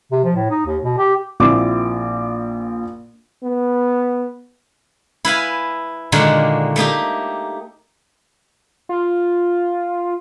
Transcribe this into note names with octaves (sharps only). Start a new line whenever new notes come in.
C3
F3
A2
D#4
D#2
B2
G4
A#1 A#2 C4 E4 D6
B3
E4 B4 F5 G#5
A#2 D3 D#3 G#3 A#3 F#4
A3 A#3 D#4 G4
F4